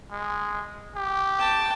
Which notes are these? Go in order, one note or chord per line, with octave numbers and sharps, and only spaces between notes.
G#3
G4
G5 A5